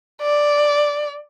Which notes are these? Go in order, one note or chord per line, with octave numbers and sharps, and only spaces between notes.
D5